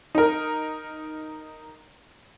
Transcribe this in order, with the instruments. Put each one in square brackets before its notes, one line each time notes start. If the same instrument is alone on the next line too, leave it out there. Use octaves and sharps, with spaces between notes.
[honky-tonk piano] D#4 A#4